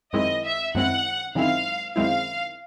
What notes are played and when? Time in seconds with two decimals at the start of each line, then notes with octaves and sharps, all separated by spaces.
0.13 F#2 D#3 G#3 C4 E4 D#5
0.44 E5
0.75 F#2 D#3 G#3 C4 E4 F#5
1.35 F#2 D#3 G#3 C4 E4 F5
1.96 F#2 D#3 G#3 C4 E4 F5